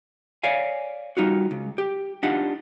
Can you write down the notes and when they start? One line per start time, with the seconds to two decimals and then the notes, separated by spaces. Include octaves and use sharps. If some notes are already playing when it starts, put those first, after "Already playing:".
0.43 C#5 D5 F5 G#5
1.17 G3 D#4 F4 F#4
1.51 C#2
1.78 G4
2.23 D4 D#4 F4 G4 F#5